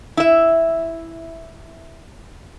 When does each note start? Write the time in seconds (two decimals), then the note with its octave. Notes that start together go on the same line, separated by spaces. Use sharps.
0.17 E4 E5